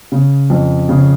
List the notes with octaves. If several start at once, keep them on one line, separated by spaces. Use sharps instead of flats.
C#3
F2
C#3